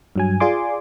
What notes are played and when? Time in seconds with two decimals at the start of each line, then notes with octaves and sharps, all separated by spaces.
0.16 G2 F#3 G#5
0.40 F4 G#4 D5 G#5 C6 D6